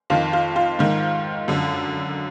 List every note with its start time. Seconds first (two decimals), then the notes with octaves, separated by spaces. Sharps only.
0.10 F2 D#3 F4
0.33 F4
0.56 F4
0.79 G#2 D#3
1.48 F#2 D3